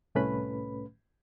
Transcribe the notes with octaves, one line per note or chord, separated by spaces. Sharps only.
C2 A2 A3 C#4 B4 B5